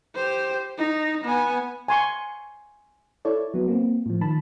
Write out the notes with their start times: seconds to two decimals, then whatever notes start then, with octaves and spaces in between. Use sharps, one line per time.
0.15 G4 C5
0.78 D#4
1.25 B3 G#5
1.88 G#5 C6 C#6
3.25 E4 A4 C#5 D5
3.54 F#3 B3
3.68 A#3 C4
4.06 A2 F3
4.21 D#3 A5 B5